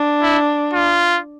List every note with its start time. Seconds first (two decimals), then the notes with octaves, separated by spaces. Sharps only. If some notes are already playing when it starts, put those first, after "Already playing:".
Already playing: D4
0.22 E4
0.73 F4